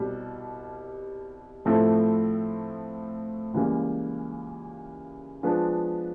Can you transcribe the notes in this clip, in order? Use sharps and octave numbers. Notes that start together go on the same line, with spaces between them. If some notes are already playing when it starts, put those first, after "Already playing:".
Already playing: C2 B2 G3
A2 F3 A3 C4 E4
C#2 C#3 E3 G3 A#3
F3 G#3 B3 D4 F4